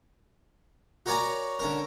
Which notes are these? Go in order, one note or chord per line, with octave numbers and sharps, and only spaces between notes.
F#4 A#4 C#5 D5 G#5 A#5
D3 C#4 A#4